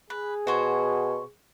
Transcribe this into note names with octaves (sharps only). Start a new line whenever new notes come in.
G#4 B4
B2 F#4 C5 C#5